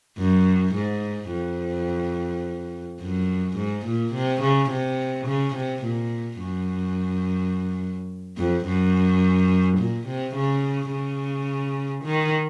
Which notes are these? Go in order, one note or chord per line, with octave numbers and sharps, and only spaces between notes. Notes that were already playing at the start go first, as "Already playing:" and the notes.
F#2
G#2
F2
F#2
G#2
A#2
C3
C#3
C3
C#3
C3
A#2
F#2
F2
F#2
A#2
C3
C#3
C#3
D#3